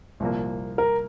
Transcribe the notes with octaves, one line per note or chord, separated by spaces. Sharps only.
C2 A#2 F3 A#3
A#4